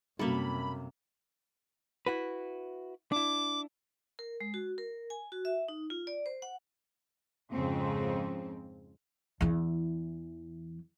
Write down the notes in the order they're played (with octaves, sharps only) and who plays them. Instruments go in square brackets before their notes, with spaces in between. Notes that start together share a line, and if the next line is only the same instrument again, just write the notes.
[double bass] F#2 C3 [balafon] G3 C#4 F#4 [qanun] A#3 A4 [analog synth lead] B5
[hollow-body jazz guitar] E4 F#4 B4
[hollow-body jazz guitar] D4 E4 [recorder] D6
[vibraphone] A#4
G#3
F#4
A#4
G#5
F#4
E5
D#4
F4
D5
C5
F#5
[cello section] F2 G#2 C#3 F3 C4
[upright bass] E2 E3